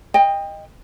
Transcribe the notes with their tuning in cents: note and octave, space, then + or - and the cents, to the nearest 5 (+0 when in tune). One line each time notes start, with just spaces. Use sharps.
D#5 +0 G5 +25